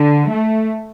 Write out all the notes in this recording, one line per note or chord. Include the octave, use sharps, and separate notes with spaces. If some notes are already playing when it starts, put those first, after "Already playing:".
Already playing: D3
A3